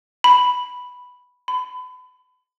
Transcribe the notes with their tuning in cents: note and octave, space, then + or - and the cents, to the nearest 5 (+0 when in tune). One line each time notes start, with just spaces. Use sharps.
B5 +0
B5 +35